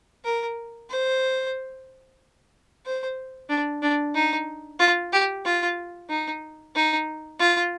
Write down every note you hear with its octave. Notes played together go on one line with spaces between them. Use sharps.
A#4
C5
C5
D4
D4
D#4
F4
G4
F4
D#4
D#4
F4